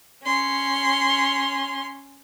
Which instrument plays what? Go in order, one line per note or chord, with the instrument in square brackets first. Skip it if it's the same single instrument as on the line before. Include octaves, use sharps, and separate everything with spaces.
[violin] C#4 C6